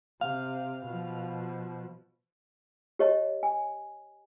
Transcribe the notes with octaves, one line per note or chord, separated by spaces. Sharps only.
C3 F5
B2 F3
G4 C#5 D#5 A5
G#5